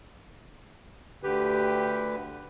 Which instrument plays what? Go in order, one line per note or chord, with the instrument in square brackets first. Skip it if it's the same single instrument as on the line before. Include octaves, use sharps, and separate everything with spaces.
[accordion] D2 D3 B4 [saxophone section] G4